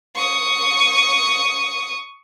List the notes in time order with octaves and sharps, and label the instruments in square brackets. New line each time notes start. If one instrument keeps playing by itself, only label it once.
[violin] C#6 D#6